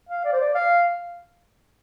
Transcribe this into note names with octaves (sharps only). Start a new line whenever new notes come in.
F5
D5
C5
D5
F5